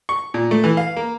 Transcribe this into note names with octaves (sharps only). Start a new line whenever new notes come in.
C#6
A#2
A3
E3
F5
A#3